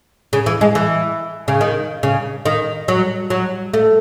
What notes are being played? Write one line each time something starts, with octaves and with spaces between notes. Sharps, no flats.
C#3
E3
G#3
E3
C#3
D#3
C#3
D#3
F#3
F#3
A3